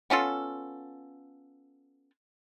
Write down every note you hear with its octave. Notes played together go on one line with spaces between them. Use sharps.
B3 C#4 F4 A4